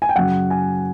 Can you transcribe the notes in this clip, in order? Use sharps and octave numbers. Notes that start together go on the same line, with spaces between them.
G#5
G5
F#2 C#3 F#3 F#5
G#5